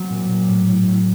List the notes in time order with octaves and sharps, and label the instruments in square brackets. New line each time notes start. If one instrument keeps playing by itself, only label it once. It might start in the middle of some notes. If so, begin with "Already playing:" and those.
Already playing: [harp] F#3 C4
A#2
A#2
A2
A2
A2